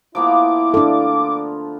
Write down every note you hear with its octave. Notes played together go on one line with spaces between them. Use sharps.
F3 A#3 B3 E4 D6
D4 F4 A4